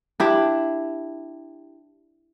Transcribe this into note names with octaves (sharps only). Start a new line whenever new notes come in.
D4 E4 G4